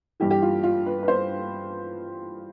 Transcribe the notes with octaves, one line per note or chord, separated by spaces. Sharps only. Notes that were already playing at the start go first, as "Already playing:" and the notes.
G2 E3 G4
G4
F4
F4
B4
B4
C5